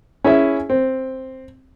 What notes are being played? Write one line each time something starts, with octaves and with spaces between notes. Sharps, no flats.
C#4 E4 G#4 E5
C4